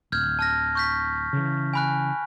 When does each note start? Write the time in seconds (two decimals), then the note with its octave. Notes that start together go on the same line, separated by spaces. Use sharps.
0.12 D1 F6 G6 G#6
0.39 A5 F6 A#6
0.75 C#6 G6 B6
1.33 C#3 E3
1.73 G#5 B5 F#6